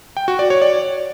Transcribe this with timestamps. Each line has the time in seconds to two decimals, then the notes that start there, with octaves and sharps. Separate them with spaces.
0.17 G5
0.28 F#4
0.39 D5
0.50 C#5
0.62 D5